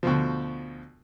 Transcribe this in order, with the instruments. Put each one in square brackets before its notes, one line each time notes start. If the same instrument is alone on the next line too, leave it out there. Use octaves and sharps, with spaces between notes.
[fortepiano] D2 B2 F3